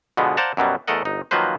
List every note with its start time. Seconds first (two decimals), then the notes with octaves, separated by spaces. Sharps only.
0.17 B2 D3 F3 G#3 B3
0.37 C5 D5 F5 F#5 A5 A#5
0.57 F#2 B2 F#3 G3
0.88 E2 A3 A4 A#4 D#5 F#5
1.05 G1 D#4
1.31 D#3 F3 F#3 A#3 B4 C5